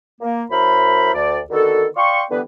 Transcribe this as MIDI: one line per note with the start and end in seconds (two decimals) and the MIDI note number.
0.21 0.44 58
0.50 1.11 42
0.50 1.11 64
0.50 1.11 70
0.50 1.11 72
0.50 1.11 83
1.14 1.40 38
1.14 1.40 74
1.50 1.85 50
1.50 1.85 51
1.50 1.85 59
1.50 1.85 66
1.50 1.85 69
1.96 2.23 74
1.96 2.23 77
1.96 2.23 79
1.96 2.23 84
1.96 2.23 85
2.30 2.40 50
2.30 2.40 52
2.30 2.40 55
2.30 2.40 59
2.30 2.40 71